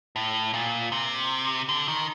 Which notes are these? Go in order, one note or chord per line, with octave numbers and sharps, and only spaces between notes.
A2
A#2
C3
D3
D#3